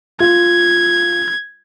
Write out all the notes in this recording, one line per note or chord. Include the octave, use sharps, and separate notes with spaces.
F4 G#6